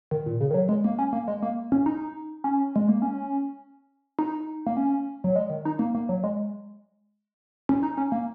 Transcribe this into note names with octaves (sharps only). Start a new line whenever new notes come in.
D#3
A#2
C#3
D#3
F#3
G#3
A#3
C#4
A#3
G#3
A#3
C#4
D#4
C#4
G#3
A#3
C#4
D#4
A#3
C#4
F#3
G#3
D#3
D#4
A#3
A#3
F#3
G#3
C#4
D#4
C#4
A#3